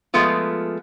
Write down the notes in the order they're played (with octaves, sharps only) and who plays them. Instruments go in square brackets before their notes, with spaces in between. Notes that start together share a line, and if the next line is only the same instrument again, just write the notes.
[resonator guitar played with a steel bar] F3 G#3 A3 B3 F4